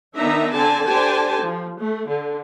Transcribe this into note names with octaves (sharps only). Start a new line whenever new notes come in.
D#3 B3 D4 D#4 E5 A#5
D3 C4 A4 G#5 A5
D4 G4 A4 C5 G#5 A5
F3
A3
D3